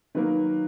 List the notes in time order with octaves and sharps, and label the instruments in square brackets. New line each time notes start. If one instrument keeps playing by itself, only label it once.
[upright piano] D#3 F#3 A#3 B4